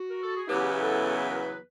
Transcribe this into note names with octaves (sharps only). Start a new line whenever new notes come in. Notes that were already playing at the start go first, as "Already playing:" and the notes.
Already playing: F#4
A#4
A4
G#4
E2 C#3 F#3 B3 E4 G4
A4
B4
A#4
B4